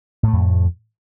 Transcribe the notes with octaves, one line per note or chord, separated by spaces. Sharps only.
F2 A2 A3